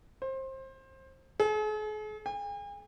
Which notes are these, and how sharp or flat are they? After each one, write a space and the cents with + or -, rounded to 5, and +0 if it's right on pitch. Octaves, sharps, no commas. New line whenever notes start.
C5 +25
G#4 +45
G#5 -45